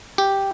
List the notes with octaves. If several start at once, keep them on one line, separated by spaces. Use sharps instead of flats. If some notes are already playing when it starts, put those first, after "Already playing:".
G4